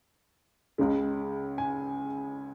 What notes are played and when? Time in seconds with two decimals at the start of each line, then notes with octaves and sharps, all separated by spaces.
0.78 C#2 C#3 G#3
1.58 G#5